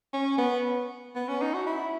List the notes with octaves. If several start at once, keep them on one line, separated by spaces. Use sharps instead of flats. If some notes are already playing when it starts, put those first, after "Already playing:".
C#4
B3
B3
C#4
D#4
F#4
E4